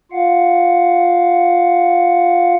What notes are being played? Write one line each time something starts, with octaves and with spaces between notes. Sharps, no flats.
F4 F5 F#5